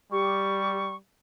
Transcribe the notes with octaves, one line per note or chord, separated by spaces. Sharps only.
G3 G4 C#6